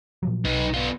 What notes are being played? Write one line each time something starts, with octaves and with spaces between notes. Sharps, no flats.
A#2 F3 F#3
B1 D#4 B4
B3 F4